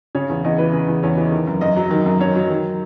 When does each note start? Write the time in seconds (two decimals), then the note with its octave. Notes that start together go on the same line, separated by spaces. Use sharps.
0.15 C#3 C#5
0.29 E2
0.44 E2 D#5
0.58 E3 B4
0.73 C#3
0.88 E2
1.03 E2 C#5
1.17 E3
1.32 D#3
1.47 F#2
1.61 F#2 D#5
1.76 F#3
1.91 D#3
2.06 F#2
2.20 F#2 C#5
2.35 F#3
2.50 D#3